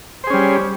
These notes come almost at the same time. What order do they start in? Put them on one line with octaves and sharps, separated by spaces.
C5 G#4 C#4 G3